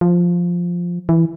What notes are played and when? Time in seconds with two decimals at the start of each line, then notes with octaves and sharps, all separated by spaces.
0.01 F3
1.09 E3